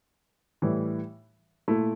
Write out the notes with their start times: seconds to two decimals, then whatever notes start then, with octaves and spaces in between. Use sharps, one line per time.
0.62 A2 E3 G3
1.68 A#2 A3 E4